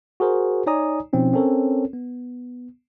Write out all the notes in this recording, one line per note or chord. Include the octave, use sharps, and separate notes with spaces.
F#4 G#4 A#4 C5
D#4 C#5 D5 G#5 A#5 D#6
B2 F3 C4 C#4 D#4
C4 C#4 A4 A#4 C#5
B3